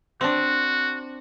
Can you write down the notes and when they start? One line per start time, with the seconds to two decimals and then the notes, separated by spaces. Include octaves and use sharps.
0.21 C4 D4 F#4